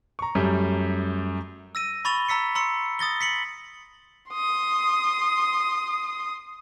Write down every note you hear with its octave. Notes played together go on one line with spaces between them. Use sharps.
A#5 C#6
F#2 G3 A3
E6 A#6 D#7
B5 C#6 A6 F7 G7
A#5 E6 B6 C#7
A#5 C6 E6 C#7
D#6 A6 A#6 G7
B6 C#7 F#7
C6 D#6